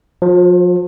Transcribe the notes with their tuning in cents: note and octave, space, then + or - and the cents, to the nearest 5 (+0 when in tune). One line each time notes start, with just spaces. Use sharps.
F3 +40 C5 +0